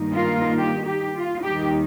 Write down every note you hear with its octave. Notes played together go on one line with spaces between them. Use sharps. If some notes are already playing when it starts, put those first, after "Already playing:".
Already playing: G2 D#3 A#3 D#4
F4 A#4
G4
G4
F4
D#2 D#3 G3 D#4 G4